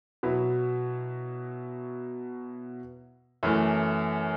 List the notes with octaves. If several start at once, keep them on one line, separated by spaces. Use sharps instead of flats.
B2 F#3 B3 E4
F#2 E3 A3